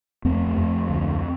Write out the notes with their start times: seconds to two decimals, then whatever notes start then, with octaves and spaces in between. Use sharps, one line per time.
0.25 F2 A3 C4
0.57 F2
0.89 D2